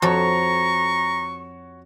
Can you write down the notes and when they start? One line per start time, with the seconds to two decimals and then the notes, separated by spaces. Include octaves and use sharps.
0.02 F2 F#4 A4 C#5 A#5 C#6